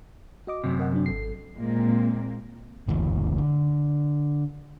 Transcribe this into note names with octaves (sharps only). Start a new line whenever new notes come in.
F#4 D#5 D6
F#2 C3
A#4 D#5 F#5
F#3 C4 D4
G#1 A4 C7
A#2 G#3 A#3 C4
F#1 D2 E3
D3